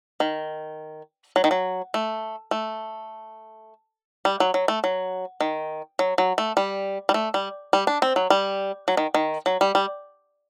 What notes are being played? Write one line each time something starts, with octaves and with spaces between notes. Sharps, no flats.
D#3
F#3
D#3
F#3
A3
A3
G3
F#3
F#3
A3
F#3
D#3
F#3
F#3
A3
G3
G3
A3
G3
G3
D4
C4
F#3
G3
F#3
D#3
D#3
F#3
G3
G3